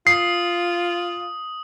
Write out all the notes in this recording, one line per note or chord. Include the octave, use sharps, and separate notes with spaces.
F4 D#6 C7